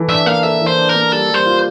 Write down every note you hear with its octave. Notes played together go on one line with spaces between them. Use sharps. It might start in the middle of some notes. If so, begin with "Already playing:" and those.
Already playing: E3 A4
D4 E5
A#3 F5
A4 E5
E3
C5
D4
A#4
A#3
G3 A4
G3 C5
F4